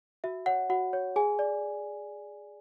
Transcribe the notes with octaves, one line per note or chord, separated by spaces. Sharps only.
F#4 E5
C#5 F#5
F#4 F#5
C#5
G#4 G#5
D5